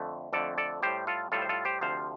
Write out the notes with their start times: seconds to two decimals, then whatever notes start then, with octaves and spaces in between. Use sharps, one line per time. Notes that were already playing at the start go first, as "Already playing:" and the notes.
Already playing: F2 D3 A3
0.33 F2 D3 A3 A4 D5
0.58 A4 D5
0.83 A2 G3 G4 C5
1.07 F4 A4
1.32 A2 G3 F4 A4
1.42 C5
1.49 F4 A4
1.65 G4 C5
1.81 D2 C3 F3 C5 F5